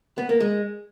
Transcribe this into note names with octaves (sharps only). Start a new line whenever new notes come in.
B3
A#3
G#3